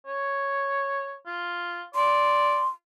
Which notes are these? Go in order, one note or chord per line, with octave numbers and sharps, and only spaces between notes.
C#5
F4
D5 C6